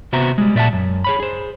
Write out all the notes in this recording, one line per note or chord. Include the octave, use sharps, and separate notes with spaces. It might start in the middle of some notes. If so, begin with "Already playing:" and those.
C3 B3 F#4 C5 E5 A#5
G3 G#3
A#2 D5 E5 F#5 A5
F#2
G#4 C#5 B5
G#4 C5